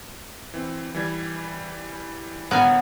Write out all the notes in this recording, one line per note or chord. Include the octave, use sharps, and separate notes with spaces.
E3 C4
E3 G3 G#6
D2 A2 B3 A#4 C#5 G#5